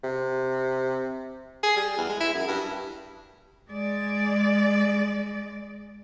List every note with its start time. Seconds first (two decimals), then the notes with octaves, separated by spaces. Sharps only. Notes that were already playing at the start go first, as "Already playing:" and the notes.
0.04 C3
1.63 G#4
1.77 G3
1.97 E2
2.09 G#3
2.20 E4
2.34 F#2
2.47 G2
3.70 G#3 D5